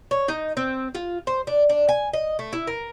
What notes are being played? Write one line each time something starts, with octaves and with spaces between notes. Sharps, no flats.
C#5
D#4
C4
F4
C5
D4
D4
G#5
D#5
A3
E4
A#4